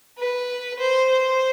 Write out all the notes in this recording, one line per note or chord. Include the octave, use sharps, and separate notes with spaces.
B4
C5
C5